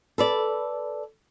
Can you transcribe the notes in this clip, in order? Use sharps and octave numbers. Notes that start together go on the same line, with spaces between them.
A4 B4 D5